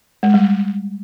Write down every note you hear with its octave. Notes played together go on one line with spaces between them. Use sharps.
G#3
G3